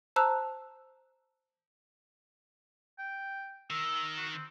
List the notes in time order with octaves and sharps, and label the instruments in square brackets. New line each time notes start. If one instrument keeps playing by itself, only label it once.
[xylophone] C5 A5 A#5 E6 F#6
[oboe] G5
[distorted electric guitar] D#3 A#4 [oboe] E6
[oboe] F#4
C4